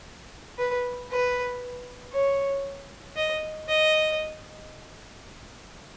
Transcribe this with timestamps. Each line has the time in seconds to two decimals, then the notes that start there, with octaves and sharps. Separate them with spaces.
0.58 B4
1.10 B4
2.13 C#5
3.16 D#5
3.68 D#5